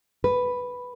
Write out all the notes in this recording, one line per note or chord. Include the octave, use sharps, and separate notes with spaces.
B4